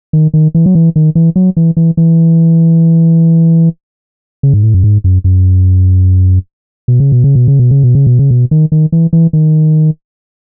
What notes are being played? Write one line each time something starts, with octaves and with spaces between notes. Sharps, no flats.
D#3
D#3
E3
F#3
E3
D#3
E3
F#3
E3
E3
E3
C#3
G#2
A2
F#2
G#2
F#2
F#2
B2
C#3
B2
C#3
B2
C#3
B2
C#3
B2
C#3
B2
C#3
B2
D#3
D#3
E3
E3
D#3